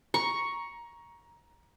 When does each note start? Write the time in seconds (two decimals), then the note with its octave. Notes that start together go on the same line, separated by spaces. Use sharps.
0.14 A#5 C#6